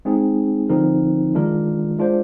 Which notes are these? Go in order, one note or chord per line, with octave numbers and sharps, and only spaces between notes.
G#3 C4 D#4 G#4
D3 F3 C4 D#4 A#4
D#3 G#3 D4 F4 A#4
G#3 D4 F4 C5